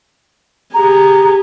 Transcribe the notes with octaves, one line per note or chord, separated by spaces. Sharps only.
G4 G#4 A#5